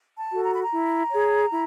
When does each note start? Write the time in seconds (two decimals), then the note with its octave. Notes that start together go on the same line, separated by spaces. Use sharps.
0.17 A5
0.30 F#4 A4
0.43 A#5
0.52 B5
0.62 A#5
0.70 E4
1.10 G#4 C#5
1.50 E4